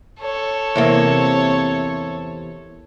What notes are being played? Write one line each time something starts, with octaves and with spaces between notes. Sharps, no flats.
A4 C#5
E2 C3 A#3